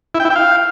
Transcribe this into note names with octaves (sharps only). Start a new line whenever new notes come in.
E4
G5
E4
G5
F5